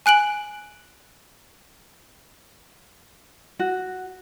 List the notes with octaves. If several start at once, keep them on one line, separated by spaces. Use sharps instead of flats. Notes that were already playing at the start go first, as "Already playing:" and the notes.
G#5 F#6 D7 F#7
F#4